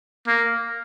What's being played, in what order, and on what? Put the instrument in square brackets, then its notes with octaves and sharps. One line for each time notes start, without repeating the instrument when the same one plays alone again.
[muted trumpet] A#3